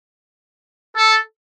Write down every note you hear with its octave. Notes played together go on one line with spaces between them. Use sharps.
A4